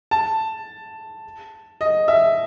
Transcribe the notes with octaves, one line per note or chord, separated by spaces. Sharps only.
A5
D#5
E5